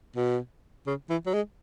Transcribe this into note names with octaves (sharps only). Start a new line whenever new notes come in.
B2
C#3
E3
F#3
G#3